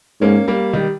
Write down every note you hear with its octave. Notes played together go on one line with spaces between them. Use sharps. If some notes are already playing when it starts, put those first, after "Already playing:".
G#2 A#3 C#4
G3 A#3
D#3 G3